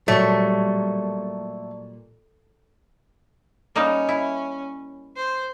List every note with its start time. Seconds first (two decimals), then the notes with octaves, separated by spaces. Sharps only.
0.08 A#2 F#3 G3 A3 D5 A5 C#6
3.76 G3 A#3 C#4 D#4
4.09 E4
5.16 C5